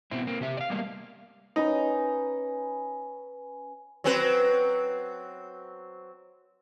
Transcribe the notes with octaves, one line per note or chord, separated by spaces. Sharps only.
B2 C4 E4
A#3 C4
C3 G4 E5
D5 F5
G3 G#3 A#3
C#4 D#4 B4 A#5
F#3 C4 B4